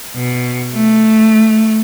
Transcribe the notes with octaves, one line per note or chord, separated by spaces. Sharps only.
B2
A3